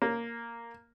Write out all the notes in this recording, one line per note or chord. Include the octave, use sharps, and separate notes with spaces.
A#3